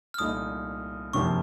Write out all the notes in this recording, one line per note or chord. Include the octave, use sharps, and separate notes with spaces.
F6
C2 A#2 A3 D#4 D#6
F#1 F2 C3 D#3 C#6